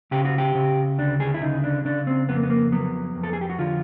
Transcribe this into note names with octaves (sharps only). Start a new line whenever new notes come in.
C#3 G4
F#4
G4
C#3
D2 D4
G#4
E4
C#3 D#4
D4
C#3 D4
C4
F2 B3
A#3
B3
A#3
F#3 B3
F2
A4
G#4
G4
F#4
D3 F4